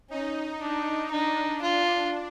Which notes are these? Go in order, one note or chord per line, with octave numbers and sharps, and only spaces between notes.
C#4 D#4
D4
D4 D#4
F4